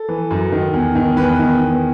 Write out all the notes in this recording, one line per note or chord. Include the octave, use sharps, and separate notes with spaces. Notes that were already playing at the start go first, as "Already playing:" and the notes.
Already playing: A4
E3
F#2
D#3
E2
D#3
E2 B4
D#3
E2